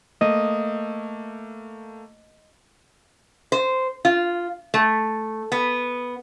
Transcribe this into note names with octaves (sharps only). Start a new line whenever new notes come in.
A3 A#3 D#5
C5
F4
A3
B3